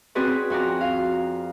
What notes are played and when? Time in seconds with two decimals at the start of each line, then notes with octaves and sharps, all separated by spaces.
0.15 C4 C#4 F#4 G#4 B4 D5
0.50 F2 F#4 D5 A#5
0.81 F5